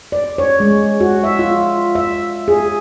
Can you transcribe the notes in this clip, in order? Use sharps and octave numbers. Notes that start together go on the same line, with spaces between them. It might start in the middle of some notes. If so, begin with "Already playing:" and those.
D5
C#5
G#3
F#4
E5
F4
E5
G#4